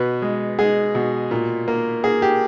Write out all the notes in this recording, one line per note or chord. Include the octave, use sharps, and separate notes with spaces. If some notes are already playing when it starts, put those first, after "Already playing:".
Already playing: B2 B4
G#3
G#3 G#4
B2
A#2
A#3
A#3 G#4
G4